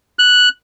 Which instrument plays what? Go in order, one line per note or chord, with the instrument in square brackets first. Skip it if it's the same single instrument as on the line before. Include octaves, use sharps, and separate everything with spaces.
[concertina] F#6